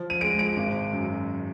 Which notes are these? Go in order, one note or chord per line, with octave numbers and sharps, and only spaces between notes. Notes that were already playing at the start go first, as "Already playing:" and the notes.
Already playing: F3
D#7
G#3 D7
D7
G#1
F#2